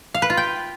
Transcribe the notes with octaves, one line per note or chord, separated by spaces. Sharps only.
F5
B4
F4
G5